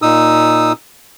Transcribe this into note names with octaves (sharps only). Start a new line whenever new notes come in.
A#2 D#4 D#6 E6